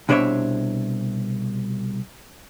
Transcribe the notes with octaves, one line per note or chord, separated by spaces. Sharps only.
C2 B2 D4 C5 C#5 E5